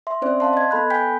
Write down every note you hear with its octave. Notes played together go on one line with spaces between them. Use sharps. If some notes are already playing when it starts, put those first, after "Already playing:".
E5 C6
C4 C#4 C5 D5
F5 A5 C6
D#5 G#6
B3 A4 B5 F#6
G5 G#5 G6 B6